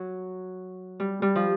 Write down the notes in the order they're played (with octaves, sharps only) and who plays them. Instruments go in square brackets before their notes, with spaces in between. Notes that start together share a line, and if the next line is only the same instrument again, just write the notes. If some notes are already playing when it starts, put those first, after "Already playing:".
Already playing: [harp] F#3
G3
G3
F3